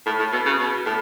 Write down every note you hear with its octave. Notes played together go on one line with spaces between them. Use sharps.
A2
A2
B2
C#3
B2
A2